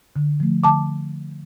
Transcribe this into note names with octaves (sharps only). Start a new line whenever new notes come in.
D3
F3 A3
D3 A5 D6